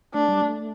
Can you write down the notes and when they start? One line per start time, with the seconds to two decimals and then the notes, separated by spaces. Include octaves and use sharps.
0.14 A3 D4
0.28 G3
0.41 A3